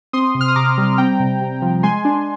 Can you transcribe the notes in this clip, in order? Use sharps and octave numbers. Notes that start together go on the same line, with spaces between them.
C4 C6 D#6
C3
F6
D#6
C3 A#5 D6
G3
C4 G5 A#5
C3
C3
F3
G#3 G#5 C6
D4